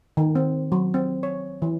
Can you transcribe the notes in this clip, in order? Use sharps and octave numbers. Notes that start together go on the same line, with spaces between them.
D#3
C4
F#3
C4
C#5
E3